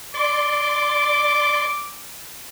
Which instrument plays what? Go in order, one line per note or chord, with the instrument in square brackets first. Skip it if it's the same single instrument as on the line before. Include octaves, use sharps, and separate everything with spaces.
[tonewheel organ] D5 C6 [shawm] D6